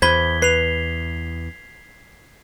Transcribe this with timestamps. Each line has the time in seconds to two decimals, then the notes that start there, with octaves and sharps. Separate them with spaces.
0.02 E2 C5 B5 G#6 B6 G7
0.42 B4 C7 F7